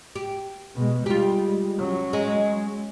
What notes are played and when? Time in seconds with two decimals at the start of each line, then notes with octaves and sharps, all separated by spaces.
0.16 G4
0.75 B2 G#3
1.06 G3 G#3 F4 G4
1.79 F#3 C#4
2.13 G#3